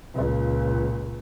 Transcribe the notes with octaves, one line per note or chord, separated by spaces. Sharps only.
C#2 A#2